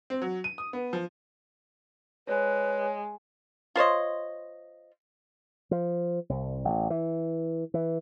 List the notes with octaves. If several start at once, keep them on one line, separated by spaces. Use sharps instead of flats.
C4
F#3
D#7
D#6
B3
F3
G#3 B4 C#5
F4 C5 C#5 D#5
F3
C2
A1
E3
E3